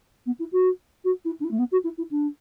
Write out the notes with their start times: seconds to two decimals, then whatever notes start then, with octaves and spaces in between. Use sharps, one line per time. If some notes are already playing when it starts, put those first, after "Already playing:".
0.26 B3
0.39 E4
0.52 F#4
1.04 F#4
1.25 E4
1.40 D4
1.44 E4
1.51 A3
1.58 B3
1.71 F#4
1.84 E4
1.97 E4
2.11 D4